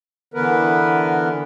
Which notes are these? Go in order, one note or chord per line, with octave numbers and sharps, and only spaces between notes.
D3 E3 B3 A#4 B4